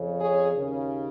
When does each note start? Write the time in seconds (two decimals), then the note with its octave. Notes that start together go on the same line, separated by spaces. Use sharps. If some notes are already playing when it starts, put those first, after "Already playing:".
Already playing: F2 C#3
0.20 G#4 C#5
0.55 D#2 C#3